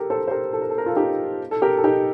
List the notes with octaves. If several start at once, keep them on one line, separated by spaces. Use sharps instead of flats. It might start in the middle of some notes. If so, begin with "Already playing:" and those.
Already playing: G4 A4 A#4
A4 C5
C5
G4 A#4
A4
A#4
A4
A#4
F4 A4
D#4 G4
A4
G4 A#4
A4
D#4 G4